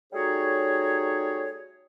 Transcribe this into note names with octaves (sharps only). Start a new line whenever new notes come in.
G3 A3 D#4 F#4 G#4 C#5